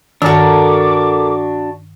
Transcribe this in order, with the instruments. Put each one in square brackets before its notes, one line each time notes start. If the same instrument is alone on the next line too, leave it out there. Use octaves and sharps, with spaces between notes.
[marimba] G2 D#3 [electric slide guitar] D4 F#4 [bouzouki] A4 A#4 [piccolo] D6